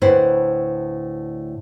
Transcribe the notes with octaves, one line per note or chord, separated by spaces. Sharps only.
D2 A2 B4 C5